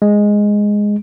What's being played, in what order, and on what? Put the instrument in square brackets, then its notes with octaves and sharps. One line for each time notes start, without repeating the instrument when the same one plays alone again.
[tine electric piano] G#3